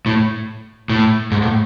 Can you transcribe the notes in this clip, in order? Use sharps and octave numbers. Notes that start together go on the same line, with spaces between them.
A2
A2
G#2
A2